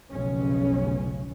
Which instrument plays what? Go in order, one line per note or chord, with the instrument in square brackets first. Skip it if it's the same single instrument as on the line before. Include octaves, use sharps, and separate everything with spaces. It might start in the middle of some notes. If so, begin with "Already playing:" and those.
[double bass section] F1 B1 C#3 C#4